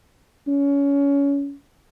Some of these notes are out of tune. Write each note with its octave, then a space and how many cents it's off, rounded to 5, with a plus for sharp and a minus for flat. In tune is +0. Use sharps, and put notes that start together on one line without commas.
C#4 +25